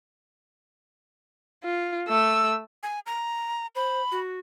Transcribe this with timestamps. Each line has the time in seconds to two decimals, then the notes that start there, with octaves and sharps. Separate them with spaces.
1.64 F4
2.08 A3 E6
2.83 G#5
3.06 A#5
3.75 C5 B5
4.12 F#4